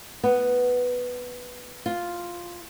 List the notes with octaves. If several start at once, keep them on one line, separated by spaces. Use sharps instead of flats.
B3
F4